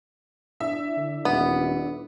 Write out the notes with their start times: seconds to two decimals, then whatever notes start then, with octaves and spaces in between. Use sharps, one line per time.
0.60 D4 E4 E5
0.97 D3
1.25 D#1 B3